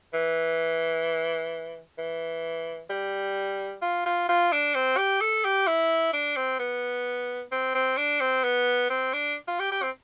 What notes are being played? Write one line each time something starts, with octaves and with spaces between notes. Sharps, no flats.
E3
E3
G3
F4
F4
F4
D4
C4
G4
A4
G4
E4
D4
C4
B3
C4
C4
D4
C4
B3
C4
D4
F4
G4
G4
C4